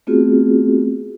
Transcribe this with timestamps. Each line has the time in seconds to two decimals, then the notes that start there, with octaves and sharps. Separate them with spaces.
0.07 A3 B3 C4 F4 F#4 G#4